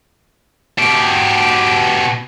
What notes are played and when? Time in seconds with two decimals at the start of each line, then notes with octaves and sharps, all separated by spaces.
0.79 B2 G4